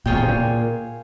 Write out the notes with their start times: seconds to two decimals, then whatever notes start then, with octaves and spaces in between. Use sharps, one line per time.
0.06 A#2 F4 G#4 C#5 G5
0.14 C3
0.23 A#2